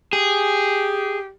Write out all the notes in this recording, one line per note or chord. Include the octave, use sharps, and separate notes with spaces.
G4 G#4